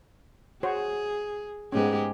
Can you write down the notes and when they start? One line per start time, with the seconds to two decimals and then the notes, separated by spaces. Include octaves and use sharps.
0.63 F#4 G#4 C5 C#5
1.72 G#2 B3 C#4 G4 G#4